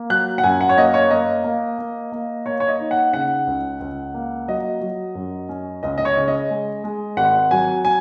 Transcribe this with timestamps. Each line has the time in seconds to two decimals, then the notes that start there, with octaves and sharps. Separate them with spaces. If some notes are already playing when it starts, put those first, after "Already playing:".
Already playing: A#3
0.10 F#3 F#6
0.38 F#5
0.44 F#2 G#5
0.61 F#5
0.69 C#5
0.77 A#3 D#5
0.94 C#5
1.10 A#3 D#5
1.44 A#3
1.78 A#3
2.12 A#3
2.46 A#3 C#5
2.60 C#5
2.68 D#5
2.80 D#4
2.91 F#5
3.13 C#3 F#5
3.47 C#2
3.81 C#2
4.14 A#3
4.48 F#3 D#5
4.81 F#3
5.15 F#2
5.49 C#4
5.83 C#2 D#5
5.98 D#5
6.05 C#5
6.17 C#3
6.28 D#5
6.50 G#3
6.84 G#3
7.17 G#1 F#5
7.51 F#3 G#5
7.85 G#5